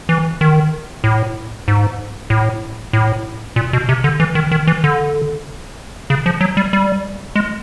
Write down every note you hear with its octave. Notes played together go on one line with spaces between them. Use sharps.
E3
D#3
A2
G#2
A2
A2
A#2
B2
C3
D3
E3
D#3
D#3
E3
D3
C#3
F3
F#3
G3
G3
G#3